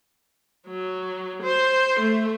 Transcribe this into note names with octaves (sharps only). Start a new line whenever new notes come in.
F#3
C5
A3